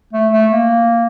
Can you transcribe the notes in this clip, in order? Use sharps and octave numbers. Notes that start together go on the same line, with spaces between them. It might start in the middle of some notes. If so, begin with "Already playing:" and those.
A3
A3
A#3